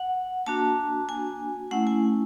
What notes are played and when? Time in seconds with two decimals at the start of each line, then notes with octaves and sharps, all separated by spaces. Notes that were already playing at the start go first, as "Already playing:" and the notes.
Already playing: F#5
0.46 A#3 D4 F#4 A5
1.09 G#5
1.71 A3 C#4 E4 F#5
1.87 G#5